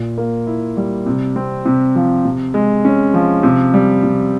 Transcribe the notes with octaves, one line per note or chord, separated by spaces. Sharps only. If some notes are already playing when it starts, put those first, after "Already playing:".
Already playing: A#2
A#3
E4
G3
C3
C4
C3
F3
C3
G#3
C#4
F3
C3
G3
C3